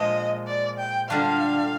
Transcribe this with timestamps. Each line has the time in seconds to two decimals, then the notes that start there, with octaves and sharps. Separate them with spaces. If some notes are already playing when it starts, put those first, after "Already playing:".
Already playing: A#2 F3 G#3 D#5
0.47 D5
0.79 G5
1.09 D3 G3 D4 F4 F5